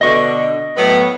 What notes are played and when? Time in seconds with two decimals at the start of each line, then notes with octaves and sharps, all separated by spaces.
0.01 B2 D3 D#5 C#6
0.77 A2 F#3 B3